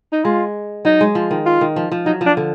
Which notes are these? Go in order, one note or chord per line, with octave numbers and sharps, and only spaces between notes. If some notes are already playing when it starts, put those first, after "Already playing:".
D#4
G#3 F4
F#3 D#4
G#3
F3
D#3
F4
D#3
F3
F3
F#3 D#4
F3
D4
D3